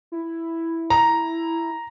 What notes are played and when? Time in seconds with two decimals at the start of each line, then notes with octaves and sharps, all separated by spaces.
0.12 E4
0.90 A#5